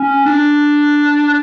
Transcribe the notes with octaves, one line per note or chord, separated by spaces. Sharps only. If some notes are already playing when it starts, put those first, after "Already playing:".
Already playing: C#4
D4